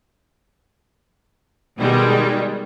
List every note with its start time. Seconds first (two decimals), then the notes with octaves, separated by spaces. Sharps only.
1.77 B2 D#3 G3 G#3